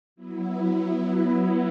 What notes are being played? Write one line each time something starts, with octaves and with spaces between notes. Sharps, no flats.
F#3 B3 E4